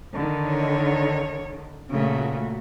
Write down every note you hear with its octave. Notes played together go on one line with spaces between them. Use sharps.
D3 D#3
C#5
A#2 C#3 A3 F#4